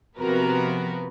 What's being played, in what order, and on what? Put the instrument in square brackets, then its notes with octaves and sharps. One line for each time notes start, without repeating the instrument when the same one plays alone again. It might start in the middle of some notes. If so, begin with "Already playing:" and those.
[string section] C3 F3 B3 F#4 A#4 B4